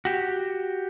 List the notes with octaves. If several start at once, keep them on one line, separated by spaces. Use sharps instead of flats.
F#4 G4